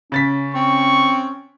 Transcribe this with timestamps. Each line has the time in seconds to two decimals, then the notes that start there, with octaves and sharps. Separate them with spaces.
0.12 C#3 C#4 A6 B6
0.55 C4 C#6